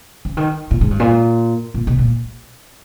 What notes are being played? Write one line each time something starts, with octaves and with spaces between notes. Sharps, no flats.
C#3
D#3
A#2
G#2
G2
A#2
A#2
B2
A#2